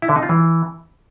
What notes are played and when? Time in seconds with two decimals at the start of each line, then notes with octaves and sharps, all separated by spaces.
0.02 E4
0.09 D3
0.16 D#4
0.23 F4
0.29 E3